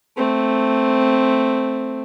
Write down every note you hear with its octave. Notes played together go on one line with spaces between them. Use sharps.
A3 C4